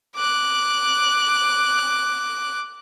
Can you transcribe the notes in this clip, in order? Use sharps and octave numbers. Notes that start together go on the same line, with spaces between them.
D6 F#6